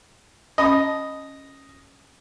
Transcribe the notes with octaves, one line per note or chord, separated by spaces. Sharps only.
C#4 D#5 A5 B5